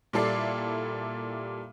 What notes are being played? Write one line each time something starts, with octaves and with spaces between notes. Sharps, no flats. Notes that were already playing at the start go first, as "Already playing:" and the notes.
A#2 G3 E4 A4 D5 C7